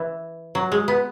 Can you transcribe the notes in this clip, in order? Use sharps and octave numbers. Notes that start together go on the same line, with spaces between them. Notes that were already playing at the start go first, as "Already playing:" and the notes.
Already playing: E3
F#3
G#3
B3